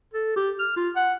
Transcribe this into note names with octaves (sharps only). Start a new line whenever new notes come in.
A4
G4
F6
F4
F#5